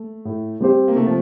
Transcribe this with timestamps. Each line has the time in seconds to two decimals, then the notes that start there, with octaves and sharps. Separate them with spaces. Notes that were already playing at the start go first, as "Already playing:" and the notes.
Already playing: A3
0.25 A2
0.60 G3 C4 G4 C5
0.88 A#3
0.96 C3 A3
1.06 F3